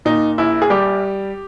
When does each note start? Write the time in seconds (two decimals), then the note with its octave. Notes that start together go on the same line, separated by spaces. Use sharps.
0.05 A#2 D#4
0.38 A#1 E4
0.62 G#4
0.70 G3 G4